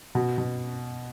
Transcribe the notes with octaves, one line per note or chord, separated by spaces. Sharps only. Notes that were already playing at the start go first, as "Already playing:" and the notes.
B2
B2